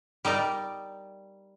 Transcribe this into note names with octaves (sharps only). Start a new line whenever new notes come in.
G3 D#4 A#4 D5